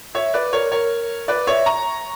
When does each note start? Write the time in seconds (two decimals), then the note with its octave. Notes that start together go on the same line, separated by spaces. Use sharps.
0.15 C#5 E5
0.34 B4 D5
0.53 A#4 C#5
0.72 A#4 C#5
1.28 B4 D5
1.47 C#5 E5
1.66 A#5 C#6